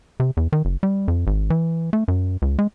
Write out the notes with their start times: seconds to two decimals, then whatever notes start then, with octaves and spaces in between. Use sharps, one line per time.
0.20 C3
0.37 E2
0.53 D#3
0.65 F#1
0.83 G3
1.08 F2
1.27 G#1
1.50 E3
1.93 A3
2.08 F#2
2.42 C#2
2.59 G#3